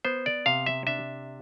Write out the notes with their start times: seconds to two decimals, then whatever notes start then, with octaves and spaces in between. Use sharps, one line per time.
0.05 B3 C5
0.26 D5
0.46 C3 F5
0.66 E5
0.87 D4 E5